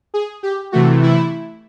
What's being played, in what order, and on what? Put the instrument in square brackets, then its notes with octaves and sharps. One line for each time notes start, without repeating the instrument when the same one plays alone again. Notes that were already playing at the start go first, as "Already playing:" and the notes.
[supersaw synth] G#4
G4
C3 E3 A3 F#4
E4